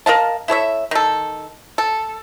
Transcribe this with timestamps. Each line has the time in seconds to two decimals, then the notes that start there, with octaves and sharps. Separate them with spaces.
0.06 A#4 D#5 F5 A5
0.48 E4 A4 C#5 E5
0.91 D#3 A4
1.78 A4